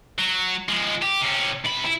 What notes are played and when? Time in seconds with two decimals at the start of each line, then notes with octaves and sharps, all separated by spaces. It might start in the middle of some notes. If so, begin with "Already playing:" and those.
0.19 F#3
0.69 F3 G#3
1.02 G4
1.21 C3 C#4
1.65 C3 B5
1.85 E4